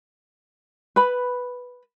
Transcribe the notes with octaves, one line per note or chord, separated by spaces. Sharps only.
B4 B5